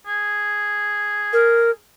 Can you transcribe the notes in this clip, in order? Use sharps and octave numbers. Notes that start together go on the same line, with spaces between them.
G#4
A#4